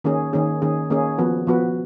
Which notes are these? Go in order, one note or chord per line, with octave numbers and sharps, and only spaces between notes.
D#3 A#3 C#4 G#4
D#3 A#3 C#4 G#4
D#3 A#3 C#4 G#4
D#3 A#3 C#4 G#4
F3 B3 F#4 B4
F3 B3 F#4 B4